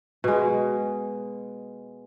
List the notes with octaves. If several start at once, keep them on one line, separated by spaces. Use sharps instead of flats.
B2 G#3